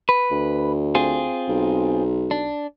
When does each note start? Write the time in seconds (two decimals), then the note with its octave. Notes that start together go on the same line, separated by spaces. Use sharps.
0.09 B4
0.31 D2
0.95 C4 F4 G#4
1.48 B1
2.31 D4